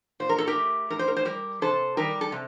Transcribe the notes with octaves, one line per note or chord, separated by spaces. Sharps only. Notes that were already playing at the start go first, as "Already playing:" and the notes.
A#2 C5
A#4
A4
G4 A#4
A3
A2 A#4
C5
A#4
C5
G3 G4 A#4
C3 A4 C5
D#3 G3 G4 A#4
A4
C3